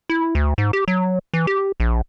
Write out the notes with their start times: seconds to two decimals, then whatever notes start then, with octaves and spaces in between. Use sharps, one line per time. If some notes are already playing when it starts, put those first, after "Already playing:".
0.10 E4
0.35 D2
0.58 G#2
0.73 G4
0.88 F#3
1.34 E3
1.47 G4
1.80 A#1